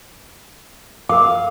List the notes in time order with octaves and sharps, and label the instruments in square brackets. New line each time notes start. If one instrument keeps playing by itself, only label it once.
[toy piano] A#4 D6 [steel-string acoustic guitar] F5